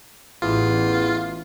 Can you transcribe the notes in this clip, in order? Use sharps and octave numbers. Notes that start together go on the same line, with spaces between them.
A1 E2 F4